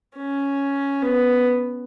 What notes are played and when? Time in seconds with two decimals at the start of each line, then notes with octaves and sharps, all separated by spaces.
0.17 C#4
1.02 B3